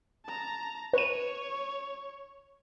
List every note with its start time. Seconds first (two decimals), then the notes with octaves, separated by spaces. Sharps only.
0.25 A5 A#5
0.93 B4 C#5 D#7